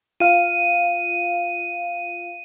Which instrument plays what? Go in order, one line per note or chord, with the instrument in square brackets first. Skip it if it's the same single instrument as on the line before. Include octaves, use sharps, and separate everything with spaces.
[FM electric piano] F4 F5 [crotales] D#7